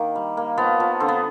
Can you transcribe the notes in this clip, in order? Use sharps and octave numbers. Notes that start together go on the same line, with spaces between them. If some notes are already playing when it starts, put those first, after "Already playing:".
Already playing: D#3 A#3
G3
A#3
F3 B3
F3
D3 C4
B3